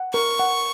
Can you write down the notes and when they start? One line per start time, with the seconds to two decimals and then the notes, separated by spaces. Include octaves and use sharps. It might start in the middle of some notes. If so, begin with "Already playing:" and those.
Already playing: F#5
0.13 A#4 C#6
0.39 F#5